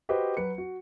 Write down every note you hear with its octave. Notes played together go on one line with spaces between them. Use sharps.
F#4 G4 B4 C5 D#5
F#3 B4 C#7
F#4